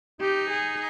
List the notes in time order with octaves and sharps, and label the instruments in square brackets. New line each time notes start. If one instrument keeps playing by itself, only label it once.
[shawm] D#4 [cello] G4
[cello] G#4